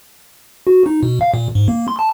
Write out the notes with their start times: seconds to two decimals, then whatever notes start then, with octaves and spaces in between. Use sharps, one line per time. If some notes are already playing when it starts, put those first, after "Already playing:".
0.67 F#4
0.86 D#4
1.03 B2
1.21 F5
1.34 A#2
1.55 G#2
1.68 A#3
1.88 C6
1.99 A5